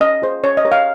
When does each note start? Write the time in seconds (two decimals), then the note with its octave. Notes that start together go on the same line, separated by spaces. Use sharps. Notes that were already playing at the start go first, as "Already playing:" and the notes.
0.01 C#4 D#5
0.22 F4 G#4 C5
0.44 C#4 C#5
0.57 D#5
0.65 G4 A#4 C#5
0.72 F5